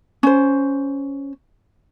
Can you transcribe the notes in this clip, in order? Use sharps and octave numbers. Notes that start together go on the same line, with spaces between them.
C#4 C5